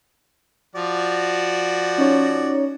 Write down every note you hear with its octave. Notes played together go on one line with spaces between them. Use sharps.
F3 F#4 D5
C#4 D#4 C#5